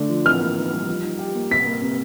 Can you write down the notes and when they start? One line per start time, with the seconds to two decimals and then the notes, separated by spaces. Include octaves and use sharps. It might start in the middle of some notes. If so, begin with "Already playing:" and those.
Already playing: D3 A3 D4
0.09 F3
0.25 E3 F6
0.40 A#3
0.57 D#4
0.73 G3
0.88 F3
1.03 D#4
1.19 G4
1.35 A#3
1.50 C3 B6
1.66 A#3
1.82 C3